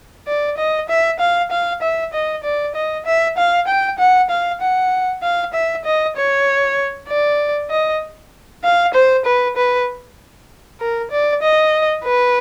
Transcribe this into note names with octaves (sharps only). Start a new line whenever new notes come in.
D5
D#5
E5
F5
F5
E5
D#5
D5
D#5
E5
F5
G5
F#5
F5
F#5
F5
E5
D#5
C#5
D5
D#5
F5
C5
B4
B4
A#4
D5
D#5
B4